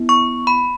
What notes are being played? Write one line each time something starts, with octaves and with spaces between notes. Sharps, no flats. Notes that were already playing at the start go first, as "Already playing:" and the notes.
Already playing: B3 E4
C#6
B5